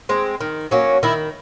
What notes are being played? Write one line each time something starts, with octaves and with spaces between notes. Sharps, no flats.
G#3 C4
D#3
F#3 A#3 C#4
D#3 E4